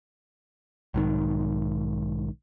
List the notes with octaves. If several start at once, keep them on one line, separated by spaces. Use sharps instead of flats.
B1 G#2 D#3